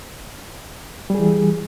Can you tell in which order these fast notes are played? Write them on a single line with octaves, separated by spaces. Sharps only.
G3 G#4 E3